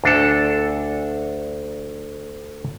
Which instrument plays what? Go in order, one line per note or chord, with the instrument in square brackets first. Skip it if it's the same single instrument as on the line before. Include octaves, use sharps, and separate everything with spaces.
[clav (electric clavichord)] D2 D4 A4